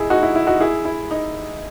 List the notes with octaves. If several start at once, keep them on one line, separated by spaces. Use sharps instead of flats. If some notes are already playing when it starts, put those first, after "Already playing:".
Already playing: D#4 E4 G#4
D#4 F#4
E4
E4
D#4 F#4
E4 G#4
E4
D#4